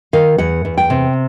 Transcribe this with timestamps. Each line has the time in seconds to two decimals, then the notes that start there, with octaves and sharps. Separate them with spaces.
0.13 D#3 F5
0.38 E2 F#5
0.65 E2
0.78 G5
0.90 C3